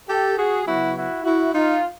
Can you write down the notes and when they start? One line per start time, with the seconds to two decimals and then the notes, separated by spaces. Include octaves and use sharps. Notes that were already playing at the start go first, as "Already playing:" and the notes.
0.08 G4 A4
0.37 F#4 G#4
0.66 C#3 F#3 B3 E4 F#4
0.95 E4 F#4
1.24 E4 F#4
1.54 D#4 F4